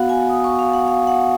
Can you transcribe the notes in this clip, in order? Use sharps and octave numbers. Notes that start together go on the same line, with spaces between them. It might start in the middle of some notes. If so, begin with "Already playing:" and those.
Already playing: B3 F#4 F5 F#5
G#5
D#6
C#6
F5
F#5
F5
F#5